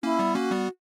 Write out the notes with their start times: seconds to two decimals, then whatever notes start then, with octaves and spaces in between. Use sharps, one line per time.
0.03 A#3 C#4 E4
0.19 G3 B3
0.35 A#3 C#4 F#4
0.51 G3 B3